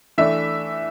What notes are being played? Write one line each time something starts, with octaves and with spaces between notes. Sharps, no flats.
E3 A3 D4 E5